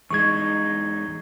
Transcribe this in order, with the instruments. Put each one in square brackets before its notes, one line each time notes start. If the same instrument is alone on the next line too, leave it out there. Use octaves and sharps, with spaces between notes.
[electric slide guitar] E2 G#3 D#4 [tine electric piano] C#6 G#6